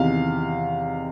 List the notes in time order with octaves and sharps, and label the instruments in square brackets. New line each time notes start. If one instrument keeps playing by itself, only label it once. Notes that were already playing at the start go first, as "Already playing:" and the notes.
Already playing: [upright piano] E2 C3 D#3 F5